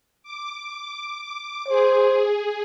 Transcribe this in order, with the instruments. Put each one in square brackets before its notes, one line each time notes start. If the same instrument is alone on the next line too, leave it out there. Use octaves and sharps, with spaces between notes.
[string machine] D6
[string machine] G#4 [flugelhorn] C5